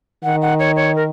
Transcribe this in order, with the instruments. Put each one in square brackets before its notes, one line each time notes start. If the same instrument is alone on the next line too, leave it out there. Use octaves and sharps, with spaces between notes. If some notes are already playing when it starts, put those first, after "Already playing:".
[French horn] D#3 [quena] F#5
[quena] F#5
C#5
C#5
A#4